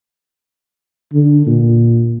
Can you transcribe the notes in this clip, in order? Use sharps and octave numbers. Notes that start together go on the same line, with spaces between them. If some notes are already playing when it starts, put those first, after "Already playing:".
D3
A#2